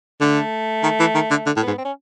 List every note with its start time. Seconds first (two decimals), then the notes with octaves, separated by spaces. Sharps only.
0.21 D3 A3
0.83 D#3
1.00 E3
1.14 D#3
1.30 D3
1.46 D3
1.56 A2
1.62 B3
1.67 G#2
1.78 C4
1.85 C#4